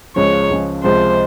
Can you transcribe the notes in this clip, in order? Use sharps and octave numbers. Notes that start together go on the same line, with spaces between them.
C#2 C#3 F3 G#3 C#5
C#2 C#3 F3 G#3
C#2 C3 F3 G#3 C5